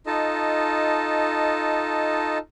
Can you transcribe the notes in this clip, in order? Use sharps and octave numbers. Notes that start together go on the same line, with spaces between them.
D#4 F4 A4 D#5 A5